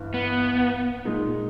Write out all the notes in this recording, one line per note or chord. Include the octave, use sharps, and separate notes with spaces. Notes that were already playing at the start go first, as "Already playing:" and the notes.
Already playing: G1 G2 E3
B3
A#2 G#3 D#4